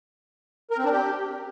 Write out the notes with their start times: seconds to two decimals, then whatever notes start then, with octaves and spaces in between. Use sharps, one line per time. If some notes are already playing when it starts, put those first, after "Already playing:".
0.71 A#4
0.78 C4
0.85 D4
0.92 G4